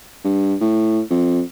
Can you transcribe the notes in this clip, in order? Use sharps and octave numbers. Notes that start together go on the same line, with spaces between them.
G2
A2
F2